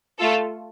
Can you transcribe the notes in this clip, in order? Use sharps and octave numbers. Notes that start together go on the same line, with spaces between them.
A3 F4 A4